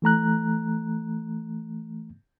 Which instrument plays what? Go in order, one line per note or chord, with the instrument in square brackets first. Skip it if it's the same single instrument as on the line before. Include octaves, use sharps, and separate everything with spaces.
[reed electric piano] E3 A3 A#5 F#6